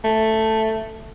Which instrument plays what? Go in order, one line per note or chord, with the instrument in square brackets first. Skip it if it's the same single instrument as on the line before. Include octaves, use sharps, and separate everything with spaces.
[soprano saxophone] A3